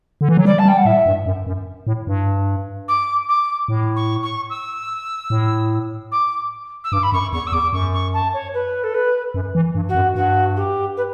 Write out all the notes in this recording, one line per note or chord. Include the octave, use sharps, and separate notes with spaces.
D3
E3
F#3
G3 D5
A5
G3 G5
F#5
A2 E5
G2
F#2
F#2
A2
G2
D6
D6
A2
C#6
C#6
E6
A2
D6
E6
G2 D6
B5
F#2 C#6
E2 C#6
E6
E2 D6
F#2 C#6
C#6
A5
C#5
B4
A4
B4
F#2
E3
G2
F#4
F#2
G2 F#4
G4
B4